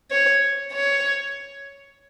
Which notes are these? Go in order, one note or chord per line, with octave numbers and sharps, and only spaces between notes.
C#5
C#5